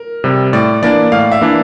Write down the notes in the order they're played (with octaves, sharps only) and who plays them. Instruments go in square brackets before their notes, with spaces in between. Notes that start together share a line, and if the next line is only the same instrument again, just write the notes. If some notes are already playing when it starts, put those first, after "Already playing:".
Already playing: [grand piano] A#4
[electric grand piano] C3 G3
[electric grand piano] A2 [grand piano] D5
[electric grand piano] E3 A#3 D4 [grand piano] D5
[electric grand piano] A2 [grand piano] F5
[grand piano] E5
[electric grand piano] E3 A#3 D4